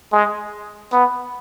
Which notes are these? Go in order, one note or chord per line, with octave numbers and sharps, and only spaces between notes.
G#3
B3